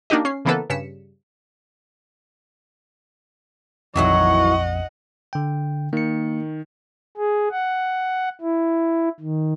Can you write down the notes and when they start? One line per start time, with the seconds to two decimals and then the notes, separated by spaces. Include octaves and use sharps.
0.10 A#3 D4 D#4 F#4 G4 D#5
0.25 C#4 C7
0.45 C#3 E3 A#3 B3 A4 B4
0.70 G2 C#3 B6 C#7 E7
3.96 A#1 F2 D#3 E3 F#3 D#5 F#5 C#6
5.33 D3 G5
5.93 D#3 A#3 C#7
7.17 G#4
7.51 F#5
8.41 E4
9.20 D#3